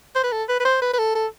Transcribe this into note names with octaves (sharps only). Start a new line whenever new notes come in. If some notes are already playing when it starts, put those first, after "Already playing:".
C5
B4
A4
B4
B4
C5
B4
B4
A4
A4